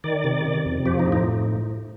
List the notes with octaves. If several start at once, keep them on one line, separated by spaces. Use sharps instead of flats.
D#3 D5
C3
C3
F2
F3 G4
D#4
A2
D#4